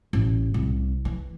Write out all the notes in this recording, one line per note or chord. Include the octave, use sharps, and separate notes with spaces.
A1
C2
E3